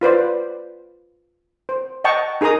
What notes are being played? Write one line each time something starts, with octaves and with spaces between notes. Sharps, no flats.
F4 B4 C5 D5
C5
D#5 F#5 G5 A5 C#6
D#4 G#4 A#4 A#5 D#6